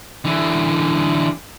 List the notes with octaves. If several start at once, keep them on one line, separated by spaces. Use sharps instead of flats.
D3 E3